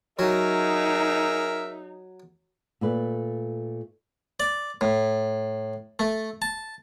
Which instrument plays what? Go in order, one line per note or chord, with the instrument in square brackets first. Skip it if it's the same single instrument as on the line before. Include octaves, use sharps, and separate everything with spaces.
[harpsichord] F#3 [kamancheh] D#4 [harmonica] G#4 A#4 E5
[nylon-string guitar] A#2 A3 B4
[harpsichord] D5
A2
A3
A5